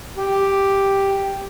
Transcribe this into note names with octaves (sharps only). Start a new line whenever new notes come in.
G4